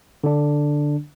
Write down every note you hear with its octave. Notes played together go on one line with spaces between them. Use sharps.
D3 D4